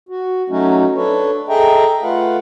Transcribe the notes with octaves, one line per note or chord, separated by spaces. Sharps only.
F#4
F#3 A3 C#4 D#4 F#4
D4 A4 B4 C#5
G#4 A4 D#5 E5 G5 A#5
A3 F4 B4 F5 F#5